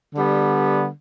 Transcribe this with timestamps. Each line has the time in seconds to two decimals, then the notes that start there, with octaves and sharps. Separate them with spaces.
0.14 D3 G3 B3